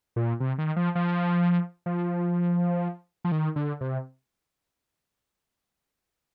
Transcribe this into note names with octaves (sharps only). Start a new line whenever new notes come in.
A#2
C3
D#3
F3
F3
F3
F3
D#3
D3
C3